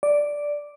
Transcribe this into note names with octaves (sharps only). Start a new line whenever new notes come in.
D5